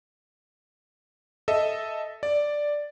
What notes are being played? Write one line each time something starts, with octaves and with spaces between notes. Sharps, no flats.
A4 D#5 E5
D5